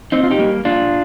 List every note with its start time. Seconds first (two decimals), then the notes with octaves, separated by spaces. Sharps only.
0.12 A#2 C4 D#4
0.23 F4
0.30 D#4 G4
0.39 G3 A#3
0.65 A#2 D4 F4